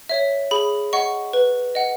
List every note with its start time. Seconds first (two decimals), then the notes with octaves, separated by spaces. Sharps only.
0.09 C#5 E5
0.51 G#4 B5
0.93 D#5 F#5 C#6
1.33 B4
1.75 D#5 F#5